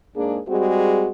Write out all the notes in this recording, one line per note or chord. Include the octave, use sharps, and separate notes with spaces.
G#2 A#3 D4 G#4
G3 G#3 C4 F#4 G#4